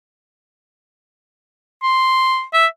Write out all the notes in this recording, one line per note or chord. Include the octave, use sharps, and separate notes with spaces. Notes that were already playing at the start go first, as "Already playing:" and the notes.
C6
E5